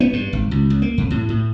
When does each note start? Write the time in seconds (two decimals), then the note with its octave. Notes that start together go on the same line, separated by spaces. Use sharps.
0.01 B3
0.13 G2
0.33 G#1
0.51 C#2
0.70 C#2
0.82 A#3
0.98 F2
1.10 A2
1.29 A2